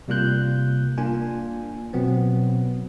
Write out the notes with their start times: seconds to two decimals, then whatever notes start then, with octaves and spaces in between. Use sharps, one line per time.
0.08 C3 G3 A#3 F4 F#6 G6
0.98 A#3 D4 F4 G#5
1.93 B2 F#3 B3 C4